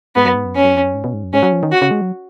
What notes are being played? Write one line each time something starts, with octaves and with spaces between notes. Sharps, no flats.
G#2 B3
F#2
G#2
F#2
F2 C#4
F#2
F2
F#2
G#2
B2
G#2
F#2
G#2 C#4
F#3
F3
D#3
F#4
C#3
G#3
F#3